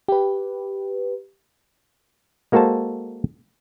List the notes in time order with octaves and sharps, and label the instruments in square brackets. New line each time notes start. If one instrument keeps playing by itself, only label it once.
[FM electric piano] G4 B4
[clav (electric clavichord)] G#3 A#3 F#4 A4 C5 A5